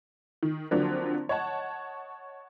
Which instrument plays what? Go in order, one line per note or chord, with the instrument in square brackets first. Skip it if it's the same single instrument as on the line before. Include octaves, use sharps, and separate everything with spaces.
[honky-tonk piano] D#3
D3 F3 F#3 A#3 C4 D4
C#5 D#5 F#5 A5